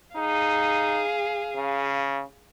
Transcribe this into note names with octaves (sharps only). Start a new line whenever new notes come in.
D#4 G#4 F5
C#3